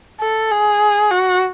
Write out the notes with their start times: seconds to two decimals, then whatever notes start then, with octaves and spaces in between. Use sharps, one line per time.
0.20 A4
0.51 G#4
1.11 F#4